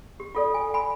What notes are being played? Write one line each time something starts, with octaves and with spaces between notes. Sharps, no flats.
G4
F4 A4 D5
G#5
G#5 B5